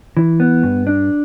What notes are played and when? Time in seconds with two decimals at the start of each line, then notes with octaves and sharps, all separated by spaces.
0.17 E3
0.40 B3
0.63 G2
0.87 D4